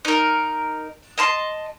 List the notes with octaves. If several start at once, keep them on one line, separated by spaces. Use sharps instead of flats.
D#4 A#4
D#5 A5 C6